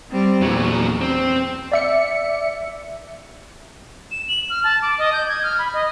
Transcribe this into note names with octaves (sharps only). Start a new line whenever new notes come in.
G3 C4
E2 A#2 F#3
C4
D5 E5 C#7
E7
F#7
F6
A5
D6
D#5
G6
G#6
F6
B5
D#5